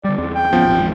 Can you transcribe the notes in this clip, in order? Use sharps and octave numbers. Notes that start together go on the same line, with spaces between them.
D3 G3 D5
E2 C4 D5
G5
D1 F3 B3 C#4
D#1 G#1 C4
G#1 E2 G#2